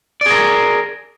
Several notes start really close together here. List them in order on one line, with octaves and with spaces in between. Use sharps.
D5 G#4 A#4